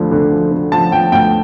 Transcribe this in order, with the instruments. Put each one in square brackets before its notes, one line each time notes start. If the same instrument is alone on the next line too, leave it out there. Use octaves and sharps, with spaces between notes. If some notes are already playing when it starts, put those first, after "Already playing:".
Already playing: [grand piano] D2 D3 F3
D3
F3
D3
F3 A5
F3 G5
D2 G5